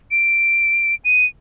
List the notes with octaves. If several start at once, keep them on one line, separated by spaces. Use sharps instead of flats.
D7
D#7